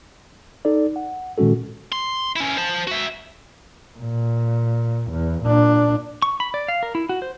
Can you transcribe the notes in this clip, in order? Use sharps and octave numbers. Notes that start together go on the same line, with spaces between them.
D#4 A4 D5
F#5
A#2 D#3 G#3 C#4 F#4 A4
C6
C#4 E4
C5 A5
F#4 E5
A#2
E2
A#2 D4
C#6
B5
D5
F5
A#4
E4
F#4
C5